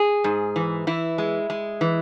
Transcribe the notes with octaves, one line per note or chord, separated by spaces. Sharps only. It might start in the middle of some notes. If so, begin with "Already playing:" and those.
Already playing: G#4
G#2
E3
E3 E4
G#3
G#3
E3